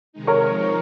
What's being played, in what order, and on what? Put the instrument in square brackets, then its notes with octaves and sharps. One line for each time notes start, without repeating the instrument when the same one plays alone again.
[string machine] C3 D#3 G#3 D#4
[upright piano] A#4 C#5
[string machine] F3 G#3 D#4